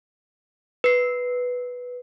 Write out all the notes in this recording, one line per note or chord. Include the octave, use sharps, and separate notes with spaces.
B4 C7